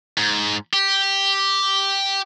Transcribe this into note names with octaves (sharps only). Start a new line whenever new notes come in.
G#2
G4